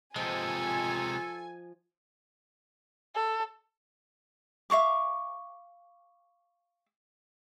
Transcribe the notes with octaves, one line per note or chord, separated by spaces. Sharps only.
C3 F3 G#3 F4 A4 D#5 G#5
A4
E5 F5 C#6 D6